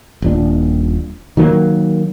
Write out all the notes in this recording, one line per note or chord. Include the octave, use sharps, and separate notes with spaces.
D#1 A#2 D4
D#3 F#3 A#3